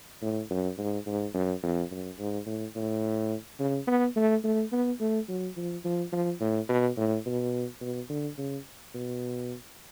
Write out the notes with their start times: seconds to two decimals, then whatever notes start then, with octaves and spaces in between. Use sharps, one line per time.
0.22 A2
0.50 F#2
0.78 G#2
1.06 G#2
1.34 F#2
1.63 F2
1.91 F#2
2.19 G#2
2.46 A2
2.76 A2
3.60 C#3
3.87 B3
4.16 A3
4.44 A3
4.73 B3
5.00 A3
5.29 F#3
5.57 F3
5.84 F3
6.13 F3
6.40 A2
6.69 B2
6.97 A2
7.26 B2
7.81 B2
8.10 D3
8.38 C#3
8.95 B2